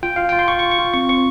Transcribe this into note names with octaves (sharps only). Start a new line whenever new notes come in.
F4 G5
F4 F5
F4 G5
C6
F4 C#6
C#6
F4
C#6
F4
C4 C#6
C4 C#6